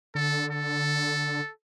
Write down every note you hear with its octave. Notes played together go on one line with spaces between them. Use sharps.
D3 A4
A4